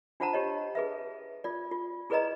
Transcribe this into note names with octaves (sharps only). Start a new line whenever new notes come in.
D4 F4 C5 F#5 A5 A#5
G4 C#5 D#5
G#4 B4 E5
F4 D5
F4
E4 G#4 B4 D5 D#5 A#5